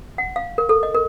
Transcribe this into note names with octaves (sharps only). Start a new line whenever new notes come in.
F#5
F5
A#4
A4
D#5
A#4